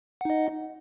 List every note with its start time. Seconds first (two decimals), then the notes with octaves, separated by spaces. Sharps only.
0.21 F#5
0.25 D#4
0.30 D#5